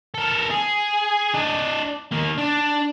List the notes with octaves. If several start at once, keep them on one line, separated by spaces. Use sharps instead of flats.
A4 A#4
G#4
D4 D#5
D#3 A#3
D4